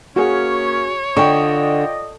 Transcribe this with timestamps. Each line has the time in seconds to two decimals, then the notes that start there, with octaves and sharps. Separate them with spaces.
0.16 A#3 C#4 F#4 G#4 C#5
1.17 D3 F4 D5 D#5 G5 C#6